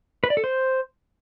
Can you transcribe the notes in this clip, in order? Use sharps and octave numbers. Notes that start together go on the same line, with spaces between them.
B4
D5
A4
C5